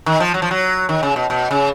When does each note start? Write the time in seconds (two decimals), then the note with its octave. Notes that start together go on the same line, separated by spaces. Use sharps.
0.06 D#3
0.20 F3
0.34 F#3
0.42 F3
0.51 F#3
0.89 D#3
1.03 C#3
1.16 B2
1.30 B2
1.51 C#3